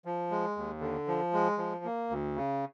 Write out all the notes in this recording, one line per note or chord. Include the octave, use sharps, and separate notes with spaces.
F3
G#3
D#2
D3
F3
G#3
F3
A#3
D2
C#3